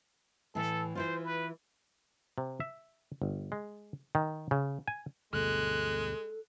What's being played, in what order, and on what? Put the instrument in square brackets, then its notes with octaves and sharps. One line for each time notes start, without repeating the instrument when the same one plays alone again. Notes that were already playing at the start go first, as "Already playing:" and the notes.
[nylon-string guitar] A2 E3 [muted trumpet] A4
[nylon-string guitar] E3 E4 F4 [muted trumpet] C5
[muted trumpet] B4
[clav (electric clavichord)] C3
E5
G1
G#3
D#3
C#3
G#5
[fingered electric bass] D2 G2 B2 [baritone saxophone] G#3 [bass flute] A4 [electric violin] F#6